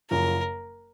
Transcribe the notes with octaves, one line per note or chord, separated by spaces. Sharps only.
F#1 F#2 F3 A#4